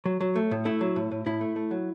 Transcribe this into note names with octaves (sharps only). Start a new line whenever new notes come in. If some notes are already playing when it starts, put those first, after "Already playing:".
F#3
F#3
A3
A2
A3 E4
F#3
A2
A2
A2 E4
A3
A3
F#3